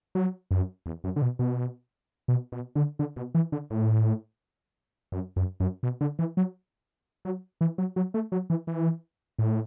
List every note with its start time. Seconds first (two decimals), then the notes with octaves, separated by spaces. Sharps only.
0.15 F#3
0.51 F#2
0.86 E2
1.04 F#2
1.16 D3
1.22 B2
1.39 B2
2.28 B2
2.52 B2
2.76 D3
2.99 D3
3.16 B2
3.35 E3
3.52 D3
3.70 A2
5.12 F#2
5.36 F#2
5.60 F#2
5.83 B2
6.01 D3
6.19 E3
6.37 F#3
7.25 F#3
7.61 E3
7.78 F#3
7.96 F#3
8.14 A3
8.32 F#3
8.50 E3
8.67 E3
9.39 A2